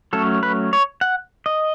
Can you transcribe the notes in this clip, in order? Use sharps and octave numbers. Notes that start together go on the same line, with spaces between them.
F#3 A3 C#4 A4
B4
C#5
F#5
D#5